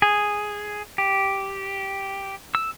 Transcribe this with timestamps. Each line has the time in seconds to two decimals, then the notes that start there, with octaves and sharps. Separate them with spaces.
0.02 G#4
0.98 G4
2.55 E6